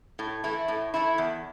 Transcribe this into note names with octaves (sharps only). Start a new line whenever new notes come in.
A2
E3 A3 E4
A2
E3 A3 E4
E2